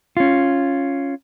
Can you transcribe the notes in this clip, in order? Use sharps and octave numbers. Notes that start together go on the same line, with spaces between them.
C#4 F4